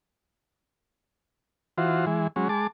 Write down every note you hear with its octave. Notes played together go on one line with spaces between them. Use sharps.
E3 F4 F#4 C5
E3 G#3
F#3 G#3 C#4
G#3 A5 D6